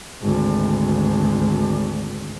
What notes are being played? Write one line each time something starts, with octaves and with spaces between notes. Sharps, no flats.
G#1 D2